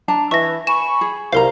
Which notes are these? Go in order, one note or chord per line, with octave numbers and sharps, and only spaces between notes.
D4 A5 A#5
E3 E5 C#6 A#6
G#5 B5 C#6 E7
G#4
C2 A#4 C5 F5 A#5